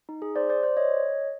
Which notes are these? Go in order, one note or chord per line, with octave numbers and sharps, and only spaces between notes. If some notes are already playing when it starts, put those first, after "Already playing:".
D#4
G#4
C5 D5
C5 D5
C5 D5
C#5 D#5